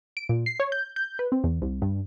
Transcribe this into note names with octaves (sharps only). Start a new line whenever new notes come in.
D7
A#2
C7
C#5
G6
G6
B4
C4
E2
C2
G2